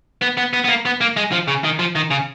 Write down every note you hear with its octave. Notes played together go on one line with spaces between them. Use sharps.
B3
B3
B3
B3
A#3
B3
A#3
G#3
F3
C#3
D#3
F3
D#3
C#3